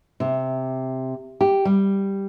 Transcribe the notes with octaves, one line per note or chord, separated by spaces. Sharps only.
C3
G4
G3